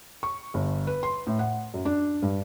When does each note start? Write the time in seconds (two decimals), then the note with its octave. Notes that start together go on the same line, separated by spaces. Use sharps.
0.23 C#6
0.54 G1
0.87 B4
1.03 C6
1.27 A2
1.39 F#5
1.74 F#2
1.85 D4
2.22 G2